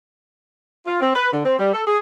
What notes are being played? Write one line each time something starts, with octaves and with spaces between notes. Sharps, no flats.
F4
C4
B4
D3
C4
G3
A4
G#4